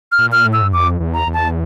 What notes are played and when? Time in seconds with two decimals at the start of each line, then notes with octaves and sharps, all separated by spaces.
0.12 F6
0.19 A#2
0.32 F6
0.45 A2
0.53 E6
0.62 G2
0.72 F2 D6
1.00 E2
1.14 A#5
1.27 E2
1.34 A5